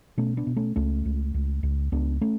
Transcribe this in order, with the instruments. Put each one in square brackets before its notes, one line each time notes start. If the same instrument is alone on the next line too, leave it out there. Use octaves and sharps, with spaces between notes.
[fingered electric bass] B2 A3 C#4
B3 D4
B2
A3 C#4
C#2 A3 C#4
C#2
C#2
C#2
C#2 B3 D4
A3 C#4